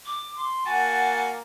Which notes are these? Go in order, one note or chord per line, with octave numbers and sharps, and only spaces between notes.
D6
C6
A#3 F#4 F#5 G#5 A5